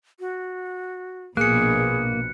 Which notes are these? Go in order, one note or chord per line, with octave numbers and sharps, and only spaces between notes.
F#4
A#1 B2 A#3 G#4 F#6 C#7